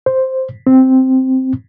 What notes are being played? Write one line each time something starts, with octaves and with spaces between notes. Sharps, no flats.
C5
C4